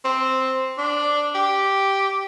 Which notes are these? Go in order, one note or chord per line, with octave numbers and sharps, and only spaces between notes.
C4
D4
G4